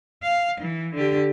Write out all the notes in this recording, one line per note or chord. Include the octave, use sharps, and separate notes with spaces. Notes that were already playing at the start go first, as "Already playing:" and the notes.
F5
E3
D3 G4